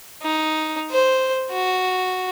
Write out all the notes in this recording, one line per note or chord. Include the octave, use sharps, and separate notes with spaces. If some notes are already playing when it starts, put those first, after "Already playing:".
D#4
C5
F#4